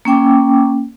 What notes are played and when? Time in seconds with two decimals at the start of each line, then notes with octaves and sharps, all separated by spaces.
0.05 A#3 C#4 G5 D6